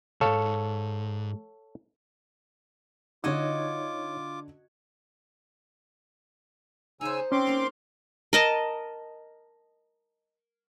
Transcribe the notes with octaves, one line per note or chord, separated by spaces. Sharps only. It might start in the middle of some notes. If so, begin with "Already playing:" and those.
C2 G#2 A4 C#5 F5
D3 D#4 F4 F#4 C#5 D#5 D6 G#6
C#3 D#4 C5 G#5 E6
C4 C#4 C6 D6
A#3 F4
A#4 D#5 A5